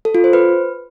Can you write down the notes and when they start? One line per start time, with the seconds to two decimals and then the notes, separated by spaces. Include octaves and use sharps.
0.05 A4
0.15 F4
0.24 C5
0.33 B4